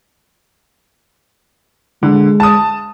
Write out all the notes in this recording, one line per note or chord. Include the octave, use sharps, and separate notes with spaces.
D3 G#3
A5 D#6